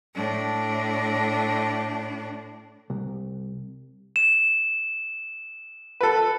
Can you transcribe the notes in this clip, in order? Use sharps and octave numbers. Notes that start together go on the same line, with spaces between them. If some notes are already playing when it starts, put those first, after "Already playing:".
A2 D4
C2
E7
A4 B4